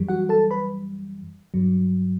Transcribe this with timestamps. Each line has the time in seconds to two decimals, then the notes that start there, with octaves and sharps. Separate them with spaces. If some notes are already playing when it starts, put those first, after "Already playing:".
Already playing: F#2 E3 G3
0.08 F#4 F#5
0.29 A4 A5
0.51 B4 B5
1.54 G2 F#3